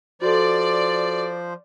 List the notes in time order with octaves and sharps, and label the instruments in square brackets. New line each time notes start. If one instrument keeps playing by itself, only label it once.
[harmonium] F3 C5 [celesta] F#4 A4 [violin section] D5